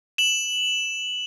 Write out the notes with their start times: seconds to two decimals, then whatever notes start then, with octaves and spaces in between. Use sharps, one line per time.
0.18 E7 F#7